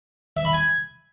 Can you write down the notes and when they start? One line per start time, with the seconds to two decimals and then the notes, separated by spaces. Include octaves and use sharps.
0.37 E5
0.45 B5
0.53 G#5